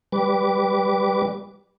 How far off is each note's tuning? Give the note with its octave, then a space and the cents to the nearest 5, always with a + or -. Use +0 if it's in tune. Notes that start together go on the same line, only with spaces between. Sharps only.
G3 +0 B4 +0 D6 -20